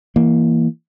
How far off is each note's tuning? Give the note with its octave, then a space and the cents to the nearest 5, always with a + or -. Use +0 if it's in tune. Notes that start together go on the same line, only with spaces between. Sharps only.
E3 +5 A#3 +0